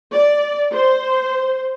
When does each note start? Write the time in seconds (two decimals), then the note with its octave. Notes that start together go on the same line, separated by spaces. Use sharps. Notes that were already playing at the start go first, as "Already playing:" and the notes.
0.13 D5
0.74 C5